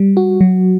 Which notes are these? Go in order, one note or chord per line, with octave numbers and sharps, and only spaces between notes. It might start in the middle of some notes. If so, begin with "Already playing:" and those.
Already playing: G3
F#4
F#3